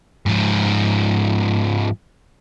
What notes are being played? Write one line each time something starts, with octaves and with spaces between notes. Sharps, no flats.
G#2 F3